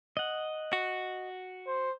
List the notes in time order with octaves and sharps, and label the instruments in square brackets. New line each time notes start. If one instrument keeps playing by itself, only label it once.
[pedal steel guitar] D#5 F#5
[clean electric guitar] F#4
[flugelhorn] C5